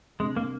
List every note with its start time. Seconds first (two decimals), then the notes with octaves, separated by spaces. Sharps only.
0.20 C3 G3 G#3 D4
0.36 A#3